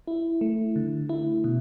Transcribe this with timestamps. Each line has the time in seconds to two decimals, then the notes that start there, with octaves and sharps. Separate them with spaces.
0.08 E4
0.41 A3
0.76 D3
1.09 E4
1.44 B2